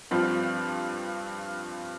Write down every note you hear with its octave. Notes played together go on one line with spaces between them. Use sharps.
G2 F3 C4 F4